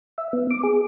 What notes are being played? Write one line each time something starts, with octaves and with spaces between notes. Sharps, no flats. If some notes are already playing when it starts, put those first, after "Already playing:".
E5
B3
D6
G#4